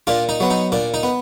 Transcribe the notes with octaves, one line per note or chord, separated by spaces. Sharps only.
A#2 D4 F4
D#4
F#3 B3
D#4
A#2 D4
D#4
B3